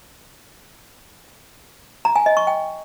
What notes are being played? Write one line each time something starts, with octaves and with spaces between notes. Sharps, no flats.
A#5
G#5
D#5
C#6
G5